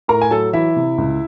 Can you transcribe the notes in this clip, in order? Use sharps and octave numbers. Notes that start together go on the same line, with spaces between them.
A2 A#4 A#5
G#5
F#3 A4 A5
E3 E4 E5
C3
C#2